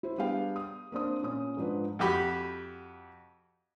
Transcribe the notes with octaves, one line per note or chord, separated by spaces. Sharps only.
E4 C5
G3 B3 D4 G#4 F5 G5
D#6
A#3 C4 D4 D#6
A#2 C#4 C#5 D#6
G#2 F3 D4 B4
F2 F#4 G4 B5